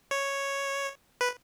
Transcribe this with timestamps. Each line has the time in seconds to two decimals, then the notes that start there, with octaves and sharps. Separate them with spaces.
0.11 C#5
1.21 B4